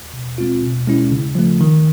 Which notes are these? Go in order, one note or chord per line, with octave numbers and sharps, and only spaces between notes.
B2
G#3 C4 F4
B2
G#3 C#4 E4
C#3
F3 A3
D#3